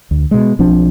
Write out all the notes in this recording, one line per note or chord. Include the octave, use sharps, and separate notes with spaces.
D2
B2 G#3
B1 F3 C4 D4